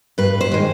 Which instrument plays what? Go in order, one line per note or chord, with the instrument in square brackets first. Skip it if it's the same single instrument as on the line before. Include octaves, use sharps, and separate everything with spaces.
[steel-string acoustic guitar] G2 B4
C5
D#3 G#3